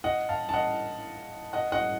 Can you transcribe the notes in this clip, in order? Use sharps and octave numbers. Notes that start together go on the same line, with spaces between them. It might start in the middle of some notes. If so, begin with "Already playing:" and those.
D#5 F#5
F5 A5
A5
D#5 F#5
D#5 F#5
D#5 F#5